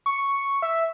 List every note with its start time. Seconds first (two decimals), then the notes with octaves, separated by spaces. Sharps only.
0.06 C#6
0.62 E5